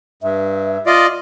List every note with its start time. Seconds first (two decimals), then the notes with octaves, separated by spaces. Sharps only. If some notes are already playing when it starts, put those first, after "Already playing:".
0.23 G2 E5
0.86 F4 D5 D#5